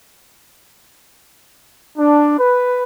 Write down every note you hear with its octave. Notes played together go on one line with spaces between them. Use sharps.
D4
B4